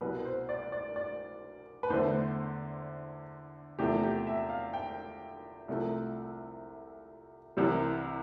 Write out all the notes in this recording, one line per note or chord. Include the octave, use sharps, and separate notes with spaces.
C2 B2 G3 B4
C5
D5
D5
D5
B4
E2 D3 A3 C5
E2 C3 F3 A3 G4
G4
E5
F5
G5
C2 C3 F3 A3
C2 C3 E3 G3